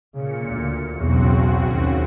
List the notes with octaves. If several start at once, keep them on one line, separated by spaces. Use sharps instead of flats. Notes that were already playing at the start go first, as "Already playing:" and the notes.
A#2 C#3 C#7
D2
B1 E2 C#3 C4 F#4
D#2